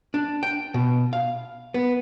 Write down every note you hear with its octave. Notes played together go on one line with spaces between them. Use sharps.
D4
G5
B2
F5
B3